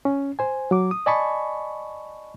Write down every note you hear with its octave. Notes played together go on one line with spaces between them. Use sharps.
C#4
C5 G#5
F#3 D6
D#6
D5 D#5 G#5 A5 B5 C#6